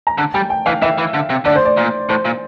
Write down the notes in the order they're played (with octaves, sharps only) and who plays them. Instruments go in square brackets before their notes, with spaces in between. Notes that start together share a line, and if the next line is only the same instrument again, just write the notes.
[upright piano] A#5
[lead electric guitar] D3 [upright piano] A5
[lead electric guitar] G3 [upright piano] G5
[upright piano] G5
[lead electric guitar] E3 [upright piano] F5
[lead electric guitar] E3 [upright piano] E5
[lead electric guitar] E3
D3
C3
[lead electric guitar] D3 [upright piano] D5
[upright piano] C5
D5
[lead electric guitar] A#2
[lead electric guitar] A2 [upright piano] C5
[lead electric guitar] A#2